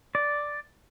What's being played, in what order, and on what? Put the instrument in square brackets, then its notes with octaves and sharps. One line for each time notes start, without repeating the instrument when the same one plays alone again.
[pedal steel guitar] D5